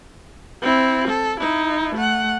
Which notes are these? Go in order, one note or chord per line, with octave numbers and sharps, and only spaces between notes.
C4 E4
A4
D#4 E4
A3 F#5